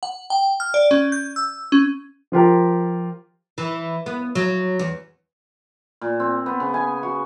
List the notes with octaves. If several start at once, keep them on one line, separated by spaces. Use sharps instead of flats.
F#5
G5
F6
D5
C#4
G6
E6
C#4
F3 F4 G4 A#4
E3
B3
F#3
E2
A#2
C4
B3
C#3
G#5
F#4